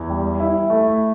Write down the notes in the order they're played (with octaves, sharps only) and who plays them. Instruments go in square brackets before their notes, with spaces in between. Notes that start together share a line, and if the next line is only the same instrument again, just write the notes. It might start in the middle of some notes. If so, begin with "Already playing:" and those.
Already playing: [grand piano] E2
G3
E4
A3